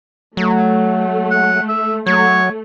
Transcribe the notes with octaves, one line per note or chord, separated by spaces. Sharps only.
F#3 A3
F#5
E5
F#3 A3 C#5